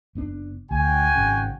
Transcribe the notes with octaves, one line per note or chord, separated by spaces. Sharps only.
F#1 B3 D4
D2 F#4 G5 G#5
G#1 C#3